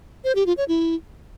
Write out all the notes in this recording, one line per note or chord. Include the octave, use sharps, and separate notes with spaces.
C5
G4
F4
C#5
E4